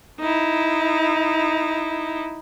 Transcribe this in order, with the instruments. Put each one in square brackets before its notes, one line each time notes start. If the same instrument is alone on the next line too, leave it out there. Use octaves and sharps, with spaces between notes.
[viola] D#4 E4